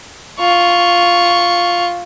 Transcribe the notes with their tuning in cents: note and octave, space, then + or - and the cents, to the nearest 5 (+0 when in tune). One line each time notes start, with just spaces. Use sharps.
F4 +0 C#6 +0